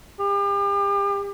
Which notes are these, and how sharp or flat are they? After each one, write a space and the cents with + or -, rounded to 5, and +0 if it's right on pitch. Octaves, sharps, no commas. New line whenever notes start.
G4 +40